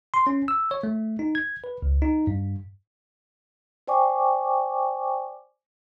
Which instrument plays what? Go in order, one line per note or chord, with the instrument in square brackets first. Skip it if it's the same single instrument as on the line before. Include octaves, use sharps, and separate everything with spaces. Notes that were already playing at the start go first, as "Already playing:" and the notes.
[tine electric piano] C6
C#4
E6
C#5
A3
D#4
G#6
B4
C#2
D#4
G2
[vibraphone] C5 D5 G5 G#5 C#6 D6